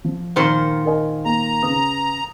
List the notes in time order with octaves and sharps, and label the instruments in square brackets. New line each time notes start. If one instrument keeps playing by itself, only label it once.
[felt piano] F3
[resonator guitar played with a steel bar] A#2 D#3 C5
[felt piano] A#4 D#5 G#5
[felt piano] A#3 [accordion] A#5
[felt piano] C#3 B4 D#6